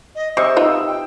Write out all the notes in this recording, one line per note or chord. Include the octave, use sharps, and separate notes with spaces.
D#5
C3 D#5 C#6 E6
D#4 F4 B4
G5